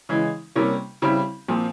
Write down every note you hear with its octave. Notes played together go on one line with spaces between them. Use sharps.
C#3 E3 G#3
C3 G3 A#3 C#4
C#3 G3 C4 E4
A#2 F3 C4